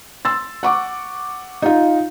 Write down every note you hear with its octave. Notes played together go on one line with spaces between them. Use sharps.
C6 E6 A6
F#5 C#6 D6
D#4 F4